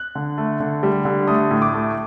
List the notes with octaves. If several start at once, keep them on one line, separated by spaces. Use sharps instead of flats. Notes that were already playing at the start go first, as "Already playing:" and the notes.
Already playing: F#6
D3
A3
D3
G3
D3
A3 D#6
A2
D6
A3